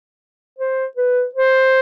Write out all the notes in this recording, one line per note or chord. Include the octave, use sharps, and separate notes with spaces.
C5
B4
C5